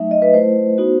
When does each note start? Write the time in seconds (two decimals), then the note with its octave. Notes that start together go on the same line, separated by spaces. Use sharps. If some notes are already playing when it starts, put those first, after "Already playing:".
Already playing: F#3 A3 D#4 E5
0.11 D#5
0.22 B4
0.34 A3 E4 C5
0.78 B3 D#4 F#4